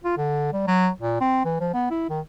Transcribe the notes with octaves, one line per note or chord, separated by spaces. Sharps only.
F4
D3
G3
F#3
A#2
C4
E3
F3
B3
E4
D#3